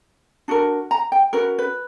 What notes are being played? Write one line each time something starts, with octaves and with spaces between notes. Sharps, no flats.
D4 F#4 A#4
A#5
G5
C#4 F#4 A#4 B4
B4